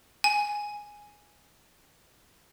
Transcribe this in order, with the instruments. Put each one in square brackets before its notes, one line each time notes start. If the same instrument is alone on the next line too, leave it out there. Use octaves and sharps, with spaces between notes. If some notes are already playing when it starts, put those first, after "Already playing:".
[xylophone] G#5